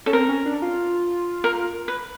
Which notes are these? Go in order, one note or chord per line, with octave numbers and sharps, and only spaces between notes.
C#4 A4
C4 A#4
C#4
D4
F4
A#4
B4